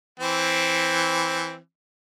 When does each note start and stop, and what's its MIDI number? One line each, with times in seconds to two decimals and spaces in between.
0.20 1.57 52
0.20 1.57 60